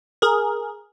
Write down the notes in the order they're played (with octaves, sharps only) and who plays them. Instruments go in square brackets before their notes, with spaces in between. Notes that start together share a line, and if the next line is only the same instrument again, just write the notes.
[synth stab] G#4 A#4